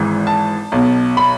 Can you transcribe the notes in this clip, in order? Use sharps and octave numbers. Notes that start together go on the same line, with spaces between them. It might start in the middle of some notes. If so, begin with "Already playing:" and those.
Already playing: G#1 G#2 E3
A5
B1 B2
B5